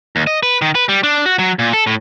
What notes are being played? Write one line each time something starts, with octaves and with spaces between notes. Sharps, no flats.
D#2
D#5
B4
D#3
B4
G3
D4
F#4
F#3
A#2
A4
A2